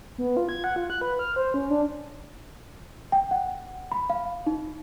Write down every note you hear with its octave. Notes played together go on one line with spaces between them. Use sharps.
B3
F4
G#6
F#5
F4
F#6
B4
F6
C5
C#4
D4
G5
F#5
B5
F5
D#4